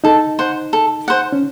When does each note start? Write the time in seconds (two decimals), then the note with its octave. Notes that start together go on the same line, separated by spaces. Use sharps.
0.04 D#4 A4
0.39 C5 F#5
0.73 A4
1.08 C5 F#5
1.32 C#4